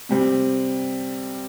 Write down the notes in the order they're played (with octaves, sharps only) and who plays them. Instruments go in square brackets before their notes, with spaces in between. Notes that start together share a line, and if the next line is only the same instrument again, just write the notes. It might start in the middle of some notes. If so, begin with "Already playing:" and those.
[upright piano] C3 G3 C4